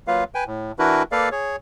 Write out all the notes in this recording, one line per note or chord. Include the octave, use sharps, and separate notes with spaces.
F#3 A#3 F4 B4 F5
B4 G5 G#5
A2
E3 D4 E4 F#4 A#4 B4
A#3 A4 B4 D5 F5
G#4 C#5